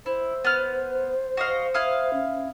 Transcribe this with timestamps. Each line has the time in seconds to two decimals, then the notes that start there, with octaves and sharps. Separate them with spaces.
0.06 E4 C5
0.45 B3 F6
1.37 F#4 D#5 F5
1.74 E4 F5 D#6
2.13 C#4